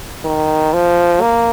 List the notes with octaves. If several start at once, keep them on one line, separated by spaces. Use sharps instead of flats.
D#3
F3
A#3